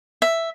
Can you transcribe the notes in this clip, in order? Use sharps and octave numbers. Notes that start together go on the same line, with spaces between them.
E5